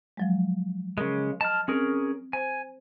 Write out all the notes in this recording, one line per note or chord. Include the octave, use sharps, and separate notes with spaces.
F3 F#3 G#3
C#3 G#3 A#4
D#5 A5 F6
C4 C#4 G#4 A#4
C5 G#5